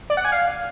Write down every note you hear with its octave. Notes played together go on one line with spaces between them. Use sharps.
D5
F#5
G#5
F5